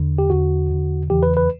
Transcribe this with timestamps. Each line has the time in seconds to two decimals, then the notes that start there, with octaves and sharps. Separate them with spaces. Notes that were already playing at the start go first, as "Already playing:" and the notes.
Already playing: E2 D3
0.18 G4
0.30 E2 D3 F#4
0.69 E2 D3
1.10 E2 C#3 E3 G4
1.23 B4
1.37 B4